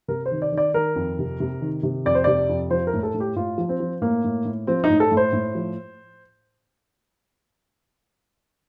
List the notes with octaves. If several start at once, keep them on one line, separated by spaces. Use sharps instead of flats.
C3 A#4
C5
D#3
D5
D#3
D5
D#3 A#4
F2
C3
C3
D#3
C3
F2 D5
C5
C3 D5
F2
F3 C5
A#4
A2
A4
A2
G4
A2 F4
F3
C4
F3
A2 A#3
A2
A2
F3 C4
D#4
A2
A4
A2
C5
A2
F3